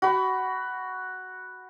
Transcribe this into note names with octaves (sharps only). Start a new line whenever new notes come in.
F#4 B5